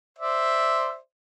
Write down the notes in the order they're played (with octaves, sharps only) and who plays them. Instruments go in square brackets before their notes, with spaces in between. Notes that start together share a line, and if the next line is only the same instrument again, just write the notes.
[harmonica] C5 D5 E5